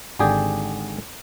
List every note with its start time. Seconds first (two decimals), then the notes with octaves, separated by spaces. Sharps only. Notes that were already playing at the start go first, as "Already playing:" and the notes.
0.19 G#1 D3 G4 G#4 D5 G5